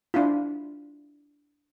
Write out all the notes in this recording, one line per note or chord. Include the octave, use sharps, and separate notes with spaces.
D4 E4 F4